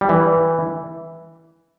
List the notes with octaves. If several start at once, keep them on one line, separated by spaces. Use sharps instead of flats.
G3
E3